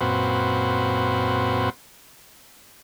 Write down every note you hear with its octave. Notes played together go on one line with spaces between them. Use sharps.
F#2 A#2 C4 F#4 B4 C5